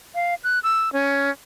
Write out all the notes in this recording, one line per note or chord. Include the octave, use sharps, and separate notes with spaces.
F5
F#6
E6
C#4